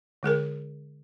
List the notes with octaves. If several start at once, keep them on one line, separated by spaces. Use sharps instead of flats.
D3 G#3 G#4 A#4